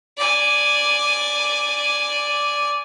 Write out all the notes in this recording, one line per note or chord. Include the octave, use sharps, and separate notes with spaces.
D5 G#5